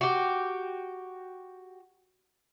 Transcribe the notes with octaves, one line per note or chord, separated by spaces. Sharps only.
F#4 G4